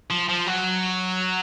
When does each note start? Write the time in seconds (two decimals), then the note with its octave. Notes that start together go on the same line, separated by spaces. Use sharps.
0.10 F3
0.29 F3
0.46 F#3